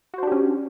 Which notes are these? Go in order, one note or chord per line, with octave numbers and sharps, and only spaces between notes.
C#4 D4 F#4 G4 C5